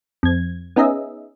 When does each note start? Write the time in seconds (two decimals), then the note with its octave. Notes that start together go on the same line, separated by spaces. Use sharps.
0.23 F2 G#6
0.76 B3 C#4 D#4 G#4 D#5 E5